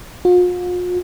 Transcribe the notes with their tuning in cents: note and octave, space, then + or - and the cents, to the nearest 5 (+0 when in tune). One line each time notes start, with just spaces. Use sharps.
F4 +45